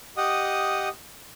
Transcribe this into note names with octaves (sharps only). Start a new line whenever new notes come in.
G4 D#5 F#5 D#6